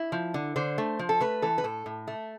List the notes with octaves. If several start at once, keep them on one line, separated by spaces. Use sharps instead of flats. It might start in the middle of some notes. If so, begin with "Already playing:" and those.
Already playing: E4
F3
D3
D3 C5
A3
F3
A4
A3 B4
E3 A4
B4
A2 A4
A2
A3